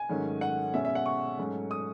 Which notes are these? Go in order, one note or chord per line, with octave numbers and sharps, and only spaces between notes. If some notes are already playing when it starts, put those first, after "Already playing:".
Already playing: G#5
G#2 D#3 F#3 A3 C#4
F#5
B2 G#3 C#4 E5
E5
F#5
C#6
G#2 F#3 A3 C#4
D#6